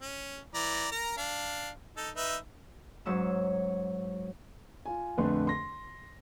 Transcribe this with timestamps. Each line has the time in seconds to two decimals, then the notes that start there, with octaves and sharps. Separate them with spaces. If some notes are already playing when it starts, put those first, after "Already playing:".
0.01 C#4
0.54 E3 D5 A#5
0.92 A#4 A#5
1.17 D4 F5
1.97 D#4 A4
2.16 D#4 B4 E5
3.06 G#2 F#3 C#4 E6
4.86 F4 G#5
5.18 A#1 F2 D3 A3 B4 C6
5.47 C6 A#6